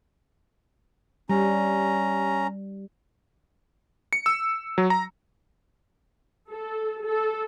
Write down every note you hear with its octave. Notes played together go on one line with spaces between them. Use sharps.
G3 C#4 A#5
C#7
E6
F#3
A#5
A4
A4